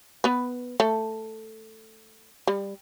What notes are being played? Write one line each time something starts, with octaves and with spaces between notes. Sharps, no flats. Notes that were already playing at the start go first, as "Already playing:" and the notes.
B3 B4
A3 A4
G3